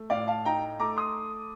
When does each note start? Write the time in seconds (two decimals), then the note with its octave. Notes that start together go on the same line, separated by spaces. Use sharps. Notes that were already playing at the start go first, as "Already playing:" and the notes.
Already playing: A3
0.10 A2 D5 F5
0.27 F5 A5
0.45 D#4 G5 A#5
0.79 A3 A#5 D6
0.97 C6 D#6